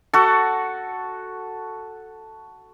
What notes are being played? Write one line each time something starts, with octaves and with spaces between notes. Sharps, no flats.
F#4 A4